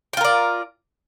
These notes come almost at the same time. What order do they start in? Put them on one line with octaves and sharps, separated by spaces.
G5 F4 A#4 D5